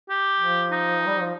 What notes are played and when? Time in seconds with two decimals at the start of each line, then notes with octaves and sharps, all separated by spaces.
0.09 G4
0.40 F3
0.71 D#4
1.06 G3
1.20 F3